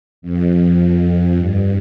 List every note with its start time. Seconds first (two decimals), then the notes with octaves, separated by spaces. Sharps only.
0.22 F2
1.38 G2